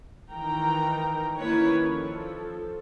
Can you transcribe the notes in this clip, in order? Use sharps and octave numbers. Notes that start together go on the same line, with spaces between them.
D#3 E3 A#4 G5 A#5
D#3 A#3 C#4 E4 B4 C#5
F3 A4